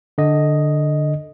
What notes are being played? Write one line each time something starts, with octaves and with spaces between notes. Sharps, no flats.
D3 D#5